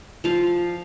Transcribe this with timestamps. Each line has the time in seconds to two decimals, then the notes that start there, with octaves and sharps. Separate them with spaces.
0.24 F3 F5